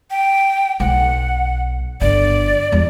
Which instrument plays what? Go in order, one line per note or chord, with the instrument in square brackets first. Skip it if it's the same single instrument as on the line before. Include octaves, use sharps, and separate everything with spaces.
[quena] G5
[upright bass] B1 [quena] F#5
[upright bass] G1 D3 [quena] D5
[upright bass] E2 G3